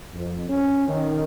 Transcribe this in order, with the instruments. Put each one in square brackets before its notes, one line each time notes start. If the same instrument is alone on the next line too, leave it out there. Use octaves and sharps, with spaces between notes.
[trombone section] F2
C#4
D#3